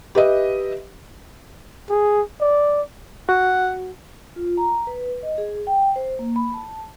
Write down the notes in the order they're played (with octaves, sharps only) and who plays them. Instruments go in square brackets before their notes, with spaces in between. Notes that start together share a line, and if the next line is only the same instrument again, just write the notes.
[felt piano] G4 B4 D#5 E5
[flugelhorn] G#4
D5
[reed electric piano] F#4 [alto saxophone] F#5
[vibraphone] F4
A#5
B4
D#5
G#4
G5
C5
A#3
B5
A5